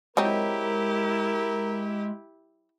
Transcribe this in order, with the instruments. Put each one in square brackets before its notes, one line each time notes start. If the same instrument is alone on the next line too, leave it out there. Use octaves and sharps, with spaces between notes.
[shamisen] F#3 C4 D#4 [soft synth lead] G#3 [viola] E4 G4 [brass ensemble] A#4